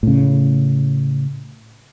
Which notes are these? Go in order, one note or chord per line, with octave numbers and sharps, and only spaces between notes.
A2 C#3